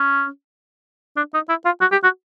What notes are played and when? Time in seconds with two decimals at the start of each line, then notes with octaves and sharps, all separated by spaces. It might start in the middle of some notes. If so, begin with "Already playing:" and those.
Already playing: C#4
1.17 D4
1.34 D#4
1.49 E4
1.65 F4
1.81 F#4
1.92 G4
2.03 F#4